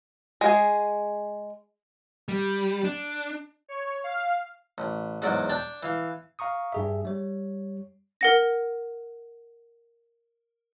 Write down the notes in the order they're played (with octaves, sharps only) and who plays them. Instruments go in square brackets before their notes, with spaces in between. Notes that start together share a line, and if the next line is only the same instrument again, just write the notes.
[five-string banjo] G#3 G#4
[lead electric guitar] G3
D4
[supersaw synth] C#5
F5
[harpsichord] A1
E2 G#2 F#3 D5 D6
D4 D5 G5
E3 F5
[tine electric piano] F5 A#5 C#6 D#6
G2 G#4 E5
G3 C#5
[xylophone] A#4 F#5 A#6